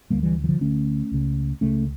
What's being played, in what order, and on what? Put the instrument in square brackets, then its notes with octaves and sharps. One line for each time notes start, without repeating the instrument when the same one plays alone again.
[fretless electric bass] D2 D3 G3 A#3
E3 G3
E3
D3 F3
D2 D3 A3 C#4
C#2 C#3
C#2 C#3 A3 C#4